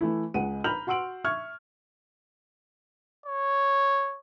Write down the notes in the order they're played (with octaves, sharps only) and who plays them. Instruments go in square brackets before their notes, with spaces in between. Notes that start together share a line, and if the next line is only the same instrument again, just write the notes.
[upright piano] E3 A3 E4
C#2 G#3 F#5 D#7
A#5 B5 F6 G6 F7 F#7
F#4 F#5 C6 E6 D7 F#7
E5 C#6 F6 G#6
[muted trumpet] C#5